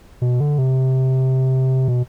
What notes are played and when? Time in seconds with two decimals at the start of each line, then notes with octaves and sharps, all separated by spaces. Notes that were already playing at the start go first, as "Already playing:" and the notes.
0.22 B2
0.40 D3
0.58 C3
1.88 B2